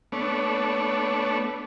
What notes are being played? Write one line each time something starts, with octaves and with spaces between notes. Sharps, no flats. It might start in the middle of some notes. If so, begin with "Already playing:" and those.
A3 B3 D4 C#5